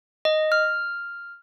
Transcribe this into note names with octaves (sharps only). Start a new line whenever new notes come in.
D#5
F6